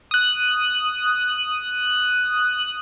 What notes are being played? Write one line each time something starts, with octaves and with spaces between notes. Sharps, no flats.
D#6 F#6